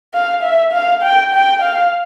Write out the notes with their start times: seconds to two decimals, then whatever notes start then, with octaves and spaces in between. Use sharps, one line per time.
0.14 F5
0.43 E5
0.72 F5
1.02 G5
1.33 G5
1.62 F5